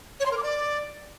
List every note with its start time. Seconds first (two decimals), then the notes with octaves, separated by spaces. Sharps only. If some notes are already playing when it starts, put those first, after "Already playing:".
0.20 C#5
0.26 C6
0.31 A#4
0.37 D6
0.43 D5